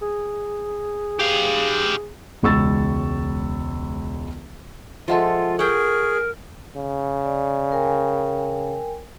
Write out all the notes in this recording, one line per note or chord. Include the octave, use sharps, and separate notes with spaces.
G#4
G4 F5
E1 C#2 C#6 E6 A6
F3 G#3 F4 A4 E5 F#5 A5
G#4 A#4 F#5 G5 C#6
C#3
D5
A#4 G5 G#5